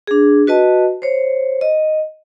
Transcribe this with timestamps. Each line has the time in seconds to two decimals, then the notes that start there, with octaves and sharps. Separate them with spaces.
0.07 D4 G#4
0.47 F#4 B4 D#5 A5
1.02 C5 C#5
1.61 D#5